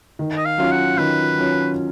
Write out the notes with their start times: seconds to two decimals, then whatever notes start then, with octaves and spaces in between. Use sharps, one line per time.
0.19 D#3
0.37 D#5
0.45 F5
0.58 F#3 C#4 F4
0.72 F#5
0.98 D#3 B4
1.38 F#3 C#4 F4